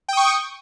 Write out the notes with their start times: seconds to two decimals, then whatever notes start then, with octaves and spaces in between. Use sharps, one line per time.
0.09 G5
0.13 D#6
0.17 C#6